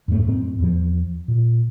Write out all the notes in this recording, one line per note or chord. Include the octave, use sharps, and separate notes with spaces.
F2 G#2 G#3 A3
F#2 A2 C4
E2 F3
A#2